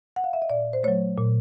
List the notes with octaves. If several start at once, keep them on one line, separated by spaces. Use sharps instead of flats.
F#5
F5
E5
D#5
A#2 D5
C5
F#3 A3 C#5
A#2